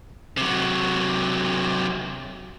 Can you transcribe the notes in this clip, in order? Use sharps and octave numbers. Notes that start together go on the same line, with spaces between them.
C3 F#3